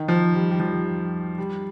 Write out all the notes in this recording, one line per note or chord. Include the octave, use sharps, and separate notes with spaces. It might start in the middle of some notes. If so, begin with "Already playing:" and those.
Already playing: D#3
F3
G3
G3
F3
G3